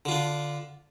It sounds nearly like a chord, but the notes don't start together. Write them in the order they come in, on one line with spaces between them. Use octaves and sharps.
D3 F4 D4